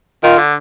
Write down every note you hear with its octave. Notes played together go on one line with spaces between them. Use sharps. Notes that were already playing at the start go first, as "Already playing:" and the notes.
D#3 F4
D3